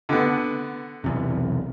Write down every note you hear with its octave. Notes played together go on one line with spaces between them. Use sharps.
D3 B3
B1 E2 C3